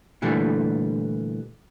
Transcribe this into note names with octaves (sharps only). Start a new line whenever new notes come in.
A#2 D3 E3 G3 A3